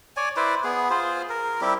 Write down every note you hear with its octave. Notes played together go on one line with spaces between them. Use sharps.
C#5 D5 G#5
E4 B4 C5 D5
B3 G#4
F4 G#4 C5
A#4
G3 C4 E4 G4